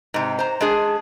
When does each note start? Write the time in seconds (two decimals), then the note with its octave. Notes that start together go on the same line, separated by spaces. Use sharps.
0.14 G#2 C3
0.39 C5 A#5
0.60 G#3 D4 G#4